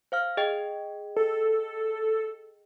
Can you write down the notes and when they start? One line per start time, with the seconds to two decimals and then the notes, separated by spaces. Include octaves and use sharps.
0.12 C5 F5 F6
0.37 G#4 D#5 G5
1.17 A4